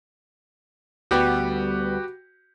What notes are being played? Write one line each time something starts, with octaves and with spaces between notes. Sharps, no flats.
D2 G3 B3 F#4 G4 B4